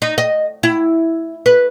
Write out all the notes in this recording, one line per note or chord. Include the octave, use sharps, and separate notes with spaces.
D#4
D#5
E4
B4